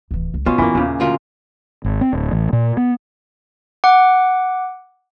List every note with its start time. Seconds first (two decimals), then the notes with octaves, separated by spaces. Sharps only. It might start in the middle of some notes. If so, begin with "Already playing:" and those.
0.11 D1 E3
0.34 C#2
0.46 B2 B3 C#4 F4
0.58 F#2 E3 A#3
0.75 D#2 A#2 C#3
1.00 D2 F4 A#4
1.84 G#1
2.01 C4
2.13 D1
2.31 A1
2.53 A#2
2.77 B3
3.84 F#5 D6